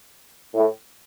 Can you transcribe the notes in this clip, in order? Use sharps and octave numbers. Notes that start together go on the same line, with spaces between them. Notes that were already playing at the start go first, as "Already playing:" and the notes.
A2